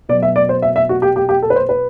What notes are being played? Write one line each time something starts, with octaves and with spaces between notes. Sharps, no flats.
B2 F#3 D5
E5
D5
C5
E5
E5
F#4
G4
G4
G4
A4
B4
C5
B4